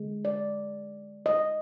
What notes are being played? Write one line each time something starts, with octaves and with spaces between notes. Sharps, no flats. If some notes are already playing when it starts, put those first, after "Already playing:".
Already playing: D3 G#3
D5
D#5